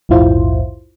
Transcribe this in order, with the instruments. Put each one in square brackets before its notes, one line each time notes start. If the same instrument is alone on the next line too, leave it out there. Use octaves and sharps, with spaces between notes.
[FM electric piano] A#1 E2 G#2 E4 F4 C5